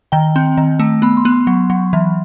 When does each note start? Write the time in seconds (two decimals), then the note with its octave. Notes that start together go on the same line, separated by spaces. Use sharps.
0.12 D#3 G5
0.36 C4
0.57 D#3
0.79 A3
1.02 B3 B5
1.17 C6
1.25 B3
1.32 C6
1.47 F#3
1.70 F#3
1.93 E3